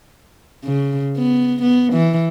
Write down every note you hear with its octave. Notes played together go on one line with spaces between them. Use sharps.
C#3
B3
B3
E3